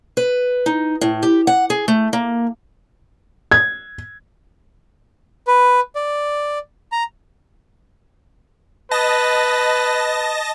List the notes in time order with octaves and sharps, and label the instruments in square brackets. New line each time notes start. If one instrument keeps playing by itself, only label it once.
[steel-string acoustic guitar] B4
D#4
A2
G4
F#5
G#4
A3
A#3
[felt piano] G#6
[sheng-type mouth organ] B4
D5
A#5
[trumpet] B4 [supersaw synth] D#5 A5 A#6